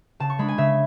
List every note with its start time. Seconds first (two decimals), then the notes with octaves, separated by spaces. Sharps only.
0.20 C#3 A5
0.30 C#6
0.39 G#3 D4 B5
0.48 G#5
0.58 C#3 E5